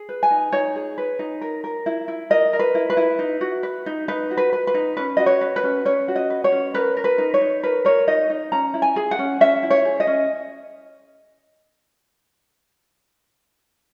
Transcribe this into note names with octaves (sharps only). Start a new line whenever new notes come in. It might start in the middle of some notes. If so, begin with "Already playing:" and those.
Already playing: G#4
B4
G#5
D#4
D#4 C#5
G#4
B4
D#4
A#4
A#4
E4
E4
A#4 D#5
A#4
B4
E4
B4
E4
D#4
F#4
B4
D#4
D#4 B4
F#4
B4
B4
B4
D#4
C#4 B4
F#4 D#5
C#5
B4
B4
C#4
C#4 C#5
F#4
D#5
B4
C#5
C#4
A#4 B4
A#4
B4
D#4
C#5
D#4
A#4 B4
A#4 C#5
D#4 D#5
D#4
C#4 A#5
E4
G#5
G#4
F#5
C#4
C#4 E5
E4
C#5
G#4
D#5
C#4